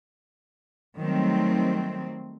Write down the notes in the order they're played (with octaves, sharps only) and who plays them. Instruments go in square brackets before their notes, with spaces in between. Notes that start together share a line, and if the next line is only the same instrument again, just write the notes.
[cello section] D#3 F#3 G3 A3 C4